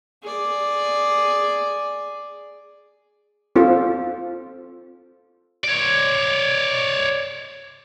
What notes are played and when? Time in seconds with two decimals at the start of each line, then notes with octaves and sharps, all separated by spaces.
0.23 G#4 D5
3.56 C4 F4 A4 C5
5.64 C#5 D5